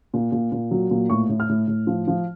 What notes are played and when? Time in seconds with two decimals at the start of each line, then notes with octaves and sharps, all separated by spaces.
0.14 A#2
0.32 A#2
0.52 A#2
0.71 F#3
0.91 A#2
1.10 A2 C#6
1.29 A2
1.40 F6
1.49 A2
1.68 A2
1.87 F3
2.08 F3